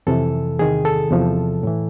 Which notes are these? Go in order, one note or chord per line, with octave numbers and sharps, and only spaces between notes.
F2 C3 E3 A4
E2 C3 D#3 G#4
A4
E2 C3 F3
A2 E3